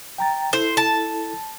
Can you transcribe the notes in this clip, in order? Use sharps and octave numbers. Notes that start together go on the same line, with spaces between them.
G5 A#5 A6
E4 A4 C5
A5